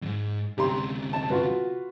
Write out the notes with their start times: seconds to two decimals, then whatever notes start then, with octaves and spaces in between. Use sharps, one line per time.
0.02 E2 G#2
0.58 D2 C3 G4 A#5 C6
1.13 A5
1.30 F4 F#4 B4